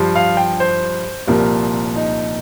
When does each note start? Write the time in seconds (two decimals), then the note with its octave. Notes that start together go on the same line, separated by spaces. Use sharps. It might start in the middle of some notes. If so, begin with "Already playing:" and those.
Already playing: G2 F3
0.16 F5
0.37 G5
0.60 C5
1.27 C2 A#2 F3 A#4
1.96 D#4